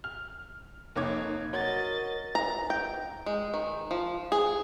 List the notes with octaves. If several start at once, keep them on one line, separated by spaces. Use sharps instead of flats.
F6
F1 A#3 D#4 C#5 D6 G#6
F#3 A#4 D#5 A6
A#5
G5
G#3
D#3
F3
G#4